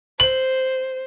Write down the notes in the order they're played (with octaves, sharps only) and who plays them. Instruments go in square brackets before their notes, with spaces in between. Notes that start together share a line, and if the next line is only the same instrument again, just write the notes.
[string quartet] C5 [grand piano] F#7